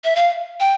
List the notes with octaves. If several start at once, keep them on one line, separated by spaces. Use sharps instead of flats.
E5
F5
G5